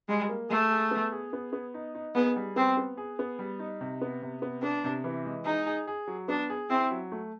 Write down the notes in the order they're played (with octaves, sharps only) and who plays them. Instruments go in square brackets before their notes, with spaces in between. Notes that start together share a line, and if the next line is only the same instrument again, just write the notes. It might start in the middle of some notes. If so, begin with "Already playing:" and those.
[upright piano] G3 [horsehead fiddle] G#3
[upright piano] A#3
[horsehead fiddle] A3 [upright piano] G#4
[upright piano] G#4
B3
G#4
B3
B3
D#4
D#4
[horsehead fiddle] B3 [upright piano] G#4
[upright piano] G3
[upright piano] B3 [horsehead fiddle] C4
[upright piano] B3
G#4
B3
G3
D#4
C3
B3
C3
B3
[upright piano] B3 [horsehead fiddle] D4
[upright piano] C3
E3
G#3
[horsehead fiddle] D#4 [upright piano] G#4
[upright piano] G#4
G#4
F#3
[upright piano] B3 [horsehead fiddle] D4
[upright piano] G#4
[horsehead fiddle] C4 [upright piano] E4
[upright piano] F#3
A3